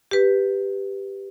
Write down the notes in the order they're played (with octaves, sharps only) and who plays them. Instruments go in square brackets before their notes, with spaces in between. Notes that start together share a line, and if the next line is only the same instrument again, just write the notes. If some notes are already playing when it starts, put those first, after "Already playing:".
[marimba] G4 B4